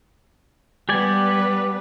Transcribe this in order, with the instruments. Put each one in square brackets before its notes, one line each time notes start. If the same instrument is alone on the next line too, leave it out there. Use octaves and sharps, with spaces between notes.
[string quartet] G3 B3 B4 [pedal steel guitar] G4 D5 G#5